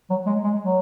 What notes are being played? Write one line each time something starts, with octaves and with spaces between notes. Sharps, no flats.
F#3
G#3
G#3
F#3